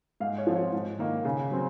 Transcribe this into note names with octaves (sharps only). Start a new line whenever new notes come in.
G#2 F5
C#5
F3 C4
C#5
G#2
D#3 A#3
C#3
F#3 C4